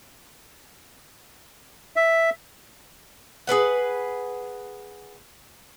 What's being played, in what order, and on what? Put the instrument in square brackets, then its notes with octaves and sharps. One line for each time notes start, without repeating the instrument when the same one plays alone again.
[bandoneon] E5
[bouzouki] G#4 A#4 B4 F#5